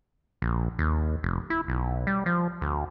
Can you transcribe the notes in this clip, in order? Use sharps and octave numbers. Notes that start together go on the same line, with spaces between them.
A#1
D#2
F1
E4
B1
G3
F3
D2